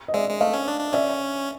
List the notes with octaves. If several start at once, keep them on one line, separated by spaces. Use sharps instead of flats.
D#5
G#3 D5 E5
G#3
A3 D#5 F5
C#4
D4
D4
C#4 D5 E5